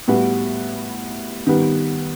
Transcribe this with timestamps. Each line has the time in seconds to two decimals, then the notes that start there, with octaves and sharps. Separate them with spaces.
0.08 A2 G3 B3 F#4
1.47 D#3 G3 B3